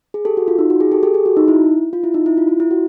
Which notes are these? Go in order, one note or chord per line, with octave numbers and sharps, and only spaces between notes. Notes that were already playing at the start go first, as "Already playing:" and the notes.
G#4
G4 A4
F#4
F4
D#4
F#4
G#4
G4 A4
G4 A4
G#4
F#4
D#4
E4
F4
E4
D#4
E4
F4
E4
E4
F#4